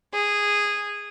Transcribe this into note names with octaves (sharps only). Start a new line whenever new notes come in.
G#4